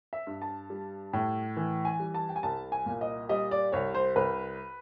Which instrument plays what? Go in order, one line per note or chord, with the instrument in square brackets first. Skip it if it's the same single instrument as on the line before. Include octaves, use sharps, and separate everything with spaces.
[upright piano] E5
G2
A5
G3
A2
E3
G#5
G3
A5
G5
G#5
C2 A5
G#5
A#2
D#5
G3 D#5
D5
C2 C#5
C5
C2 B4